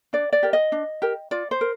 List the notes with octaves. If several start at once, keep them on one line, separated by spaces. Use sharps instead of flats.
D4 D5
D5
G4 A#4
D#5
D4
G4 A#4
F4 D5
C5
A#4